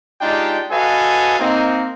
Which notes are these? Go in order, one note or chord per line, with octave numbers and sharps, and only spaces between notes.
G#3 D4 D#4 F4 G4 G5
F#4 A4 B4 D#5 F5 G#5
A#3 C4 D#4